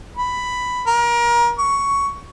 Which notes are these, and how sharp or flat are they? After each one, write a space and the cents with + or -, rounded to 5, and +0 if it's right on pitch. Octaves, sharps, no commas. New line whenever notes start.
B5 +5
A#4 +30
C#6 +10